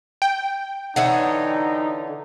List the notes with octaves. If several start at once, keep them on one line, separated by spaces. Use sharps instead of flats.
G5
D3 E3 D#4 C#5 F#5